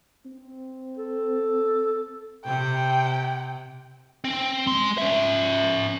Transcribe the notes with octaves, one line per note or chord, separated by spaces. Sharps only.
C4
A4
C3 G5
C4
G#3 C6
C#4 E5